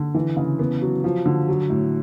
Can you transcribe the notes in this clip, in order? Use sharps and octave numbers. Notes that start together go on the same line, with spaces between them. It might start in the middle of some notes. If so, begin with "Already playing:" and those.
Already playing: D3
E3
C#3
B3
F#3
F3
D3
F#3
A2